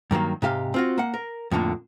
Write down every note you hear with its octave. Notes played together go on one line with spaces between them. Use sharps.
G2 D#3 F#3 A#3
G#2 C3 G4 F5
C4 F4 F#4
A#3 F#5
A#4
F2 A2 D3 A#3